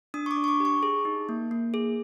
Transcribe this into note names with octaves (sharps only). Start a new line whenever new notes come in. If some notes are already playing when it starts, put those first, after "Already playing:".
D4 D#6
C#6
D6
D4
C#6
D6
G4 C#6
G#4
D#4
A#3
A#3
G#4